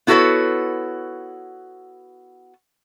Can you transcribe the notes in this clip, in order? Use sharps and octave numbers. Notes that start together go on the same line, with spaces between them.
B3 E4 F#4 A4 B4 C#5